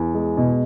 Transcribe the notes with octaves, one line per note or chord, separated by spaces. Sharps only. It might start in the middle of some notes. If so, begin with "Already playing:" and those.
Already playing: E2
G#3
B2